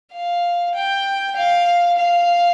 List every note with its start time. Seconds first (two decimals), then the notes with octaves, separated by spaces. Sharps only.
0.13 F5
0.74 G5
1.36 F5
1.98 F5